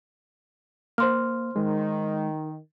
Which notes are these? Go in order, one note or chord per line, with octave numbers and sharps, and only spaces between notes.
A#3 C5 C6 F6
D#3 G#3